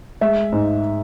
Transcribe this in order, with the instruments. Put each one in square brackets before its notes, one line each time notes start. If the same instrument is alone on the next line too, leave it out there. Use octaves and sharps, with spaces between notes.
[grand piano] G#3 E5
G#2